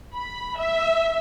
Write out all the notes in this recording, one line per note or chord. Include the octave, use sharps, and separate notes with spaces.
B5
E5